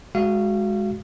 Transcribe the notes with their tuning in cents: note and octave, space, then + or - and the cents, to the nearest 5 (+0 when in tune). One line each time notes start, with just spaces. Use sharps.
G#3 +0 F#4 +0 F5 -30